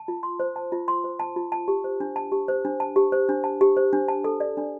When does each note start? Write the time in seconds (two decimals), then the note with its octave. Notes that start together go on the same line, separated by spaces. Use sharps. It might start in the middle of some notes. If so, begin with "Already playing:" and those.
Already playing: A5
0.08 F4
0.23 C6
0.40 C5
0.56 A5
0.72 F4
0.88 C6
1.04 C5
1.20 A5
1.36 F4
1.52 A5
1.68 G4
1.84 C5
2.00 D4
2.16 A5
2.32 G4
2.48 C5
2.65 D4
2.80 A5
2.96 G4
3.12 C5
3.29 D4
3.44 A5
3.61 G4
3.77 C5
3.93 D4
4.08 A5
4.24 A4
4.40 D5
4.57 D4